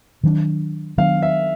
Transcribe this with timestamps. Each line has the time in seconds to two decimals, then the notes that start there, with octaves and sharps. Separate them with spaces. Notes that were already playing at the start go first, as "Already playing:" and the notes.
0.23 D#3 F#3 B3 D4
0.98 D#3 F#3 B3 D4 F5
1.22 E5